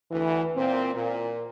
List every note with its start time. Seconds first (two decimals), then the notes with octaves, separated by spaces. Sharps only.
0.11 D2 E3
0.56 A#2 C4
0.95 A#2